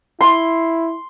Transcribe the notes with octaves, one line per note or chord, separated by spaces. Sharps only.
E4 C6